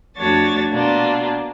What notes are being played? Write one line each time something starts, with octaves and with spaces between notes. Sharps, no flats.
F2 A3 D4 F#4 C#5 A6
B2 A#3 D4 F4